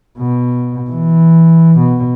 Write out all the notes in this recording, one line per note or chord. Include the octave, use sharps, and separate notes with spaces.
B2
E3
B2